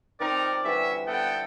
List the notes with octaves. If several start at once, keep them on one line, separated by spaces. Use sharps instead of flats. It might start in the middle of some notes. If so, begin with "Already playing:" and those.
D#3 F3 C4 D#4 A#4 D5
D3 E3 G3 C#4 F#4 E5
B3 A4 E5 F#5 G5